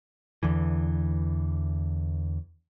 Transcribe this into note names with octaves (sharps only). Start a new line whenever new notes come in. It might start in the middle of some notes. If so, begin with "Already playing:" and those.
E2 D3 E3